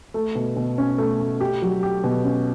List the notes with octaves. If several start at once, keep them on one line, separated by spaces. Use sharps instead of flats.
A3
B2
B2
C#4
A3
A3
G4
F#3
G4
B2
C#4